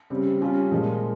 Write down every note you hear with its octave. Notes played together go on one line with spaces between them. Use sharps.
C#3 G3 C4
G3 C#4 F4
A#2 F3 G#3